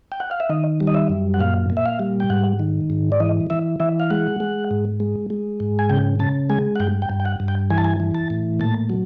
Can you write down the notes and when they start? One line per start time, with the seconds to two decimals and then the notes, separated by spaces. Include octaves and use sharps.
0.12 G5
0.20 F#5
0.31 F5
0.40 E5
0.49 D#3 D#5
0.80 G3
0.87 D#5
0.94 E5
1.09 F#2
1.34 F#5
1.40 A#2 F5
1.70 A#2
1.77 E5
1.86 F5
2.00 G3
2.20 G5
2.30 G#2 F#5
2.59 D#3
2.90 G#2
3.12 D5
3.20 E3 D#5
3.50 E3 E5
3.80 E3 E5
4.00 F5
4.10 G#3 F#5
4.40 G#3
4.71 G#2
5.00 G#3
5.30 G#3
5.60 G#2
5.79 G#5
5.90 C#3 G5
6.20 C#3 A5
6.50 G#3 G#5
6.76 F#5
6.80 G2 G5
7.02 G5
7.10 G2
7.20 G5
7.25 F#5
7.40 G2
7.48 G5
7.70 E3 G#5
7.78 A5
7.84 G#5
8.00 E3
8.15 A5
8.30 A2
8.60 A#2 A5
8.90 F#3